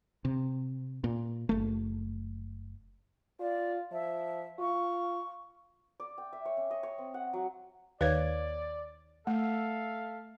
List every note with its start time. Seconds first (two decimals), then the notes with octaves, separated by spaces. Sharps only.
0.25 C3
1.04 A#2
1.49 F#1 A3
3.41 F4 D5
3.93 F3 E5
4.59 F4 C#6
6.00 D5
6.18 G5
6.33 E5
6.45 C#5
6.57 C#4
6.71 D#5
6.83 C#5
6.98 C4
7.14 F#5
7.33 F#3
8.01 D#2 B4 C#5 D5 F5 G#6
9.27 A3 A4 E5 F5